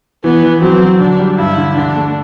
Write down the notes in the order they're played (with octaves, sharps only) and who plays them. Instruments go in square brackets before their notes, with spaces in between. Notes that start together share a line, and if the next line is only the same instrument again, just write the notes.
[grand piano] E3 [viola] B3
[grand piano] E3
[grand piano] F#3 [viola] C4
[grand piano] F#3
[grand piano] D3 [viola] D4
[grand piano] G3
[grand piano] G2 [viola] E4
[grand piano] D3
[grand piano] D3 [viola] D4
[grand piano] A3